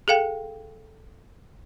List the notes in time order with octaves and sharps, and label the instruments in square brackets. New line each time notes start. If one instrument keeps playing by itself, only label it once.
[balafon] G#4 A4 F5 G5